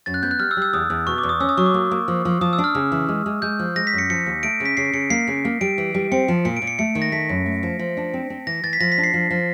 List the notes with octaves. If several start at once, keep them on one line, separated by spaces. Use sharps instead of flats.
F#2 A6
F#6
B3 G6
F#6
G3 F6
E6
G3
E6
E2 D#6
E2
B2 C#6
E2 D6
D#6
C#4 E6
D#6
F#3 C#6
D6
A#3
A#3
F3
F3
F3 D#6
E6
D4
F6
C#3
E3
G#3
G#3
G#3 G6
F3
G#3 A#6
B6
F#2
C#7
F3 C#7
D#2
A3 D7
C#3
B6
C#3 C7
C#3 C#7
A#3 C7
C#3
A#3
G3 D7
E3
G3
C4 C#7
F3
A#2 C#7
D7
A#2
C#7
A3 C#7
D#3
A#6
A3 B6
F#2
A3
F3
F3
D4
C4
C4
E3 A#6
E3 A6
B6
F3 A#6
B6
D4
C7
F3
F3